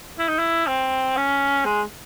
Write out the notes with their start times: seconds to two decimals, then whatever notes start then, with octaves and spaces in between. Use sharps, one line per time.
0.18 E4
0.29 D#4
0.39 E4
0.67 C4
1.17 C#4
1.65 G#3